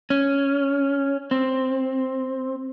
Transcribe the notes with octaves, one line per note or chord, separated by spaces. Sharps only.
C#4
C4